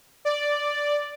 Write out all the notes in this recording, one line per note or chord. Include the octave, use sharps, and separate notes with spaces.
D5